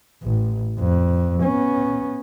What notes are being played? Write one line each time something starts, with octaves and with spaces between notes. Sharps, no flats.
A1
F2
B3 C#4